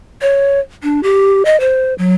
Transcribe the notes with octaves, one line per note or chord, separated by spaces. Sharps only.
C#5
D4
G4
D#5
C5
F#3